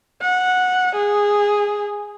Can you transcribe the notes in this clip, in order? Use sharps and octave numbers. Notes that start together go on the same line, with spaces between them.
F#5
G#4